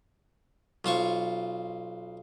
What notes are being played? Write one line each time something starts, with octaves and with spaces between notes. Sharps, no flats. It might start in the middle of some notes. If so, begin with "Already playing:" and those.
B1 F4 C5 C#6